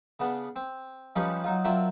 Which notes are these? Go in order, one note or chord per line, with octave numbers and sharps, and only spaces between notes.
C#3 B3 D4
C4
F3 G3 C#4 D#4 B4 C#5
F#3 D#4 F4
F#3 C4 D4 F4 A#4 E5